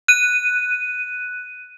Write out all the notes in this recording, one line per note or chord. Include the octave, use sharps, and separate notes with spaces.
F#6 D#7